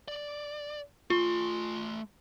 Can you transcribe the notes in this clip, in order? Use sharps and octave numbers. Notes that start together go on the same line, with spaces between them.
D5
A3 F4 C6